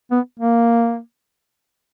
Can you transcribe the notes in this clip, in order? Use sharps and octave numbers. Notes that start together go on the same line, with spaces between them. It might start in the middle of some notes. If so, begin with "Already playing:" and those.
B3
A#3